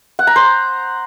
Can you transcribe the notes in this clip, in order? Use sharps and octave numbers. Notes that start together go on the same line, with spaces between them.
F#5
A#5
C5